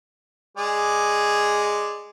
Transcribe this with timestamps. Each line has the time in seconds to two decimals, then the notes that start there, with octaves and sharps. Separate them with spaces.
0.57 G#3 G#4 D5